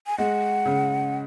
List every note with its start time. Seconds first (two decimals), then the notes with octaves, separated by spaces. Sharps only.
0.07 G#5
0.18 G#3 F#5
0.65 C#3